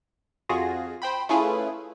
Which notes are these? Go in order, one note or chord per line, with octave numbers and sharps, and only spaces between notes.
F2 F4 F#4 G#4 A#6
C5 G5 B5
A3 C#4 E4 F4 G#4 B4